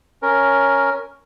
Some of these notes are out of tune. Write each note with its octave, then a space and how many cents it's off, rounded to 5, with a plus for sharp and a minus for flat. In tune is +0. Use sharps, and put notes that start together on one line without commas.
C#4 +0 A#4 +0